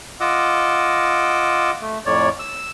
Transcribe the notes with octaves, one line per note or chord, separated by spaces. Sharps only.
F4 D#5 F#5 D6 E6
A3
F2 A2 C#5 D5
E6